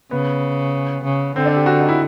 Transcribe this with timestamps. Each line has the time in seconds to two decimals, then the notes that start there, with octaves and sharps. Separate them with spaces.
0.11 C#3 B3
1.04 C#3
1.36 D3 C4
1.46 D4
1.57 G4
1.66 F#4
1.80 D#4
1.89 E4